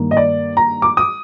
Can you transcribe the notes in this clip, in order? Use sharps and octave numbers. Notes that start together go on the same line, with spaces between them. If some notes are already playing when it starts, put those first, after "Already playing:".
Already playing: G2 D#3 A#3
D#5
D5
A#5
D6
D#6